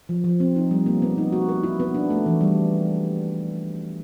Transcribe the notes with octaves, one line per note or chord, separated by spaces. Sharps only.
F3
F3
C4
D#4
G3
A#3
B3
D#4
F#4
A#4
E4
B3
D4
A3
E3
G3